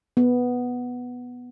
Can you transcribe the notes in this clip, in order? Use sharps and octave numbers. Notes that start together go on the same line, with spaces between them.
B3